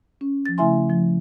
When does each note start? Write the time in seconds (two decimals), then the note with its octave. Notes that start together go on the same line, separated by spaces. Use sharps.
0.21 C#4
0.46 F3 A6
0.58 C#3 A3 E4 E5 G#5 C6
0.90 F3